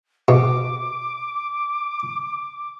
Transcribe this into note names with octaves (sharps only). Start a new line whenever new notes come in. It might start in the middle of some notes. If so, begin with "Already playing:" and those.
B2 D6